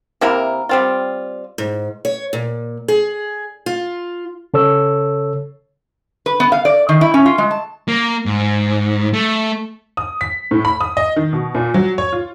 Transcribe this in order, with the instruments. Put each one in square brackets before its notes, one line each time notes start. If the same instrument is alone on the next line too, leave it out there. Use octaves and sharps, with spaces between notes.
[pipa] C3 A#3 E4 A#4
G3 C4 F4
[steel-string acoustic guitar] G#2
C#5
A#2
G#4
F4
[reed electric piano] C#3 A4 C#5 E6
[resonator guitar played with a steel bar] B4
B3
F5
D5
D#3
E4
C#4
F4
G#3
A5
[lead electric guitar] A#3
G#2
A3
[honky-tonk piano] D#6
B6
A2
B5
D#6
D#5
D#3
B2
A#2
F#3
C#5
F4